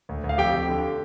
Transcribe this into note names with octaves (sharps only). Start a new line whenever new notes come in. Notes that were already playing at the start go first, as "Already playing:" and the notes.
D2
D2
F5
F2 G4 G5
F2
D3